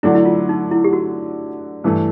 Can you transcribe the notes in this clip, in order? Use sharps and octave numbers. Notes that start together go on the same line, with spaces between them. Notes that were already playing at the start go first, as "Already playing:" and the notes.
D3 F#3 A3 D4 E4
E4
F4
D#4
E4
G4
F#4
G2 E3 A3